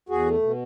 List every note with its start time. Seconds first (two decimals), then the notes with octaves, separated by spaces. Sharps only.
0.09 E2 F#4 G#4
0.25 A3
0.42 B2